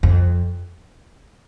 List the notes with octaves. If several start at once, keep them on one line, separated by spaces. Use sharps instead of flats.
F2